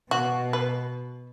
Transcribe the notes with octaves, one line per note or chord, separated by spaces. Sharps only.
B2 F#4
B4